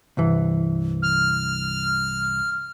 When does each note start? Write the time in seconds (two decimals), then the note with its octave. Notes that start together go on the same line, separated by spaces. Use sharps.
0.17 C2 G2 E3
1.02 F6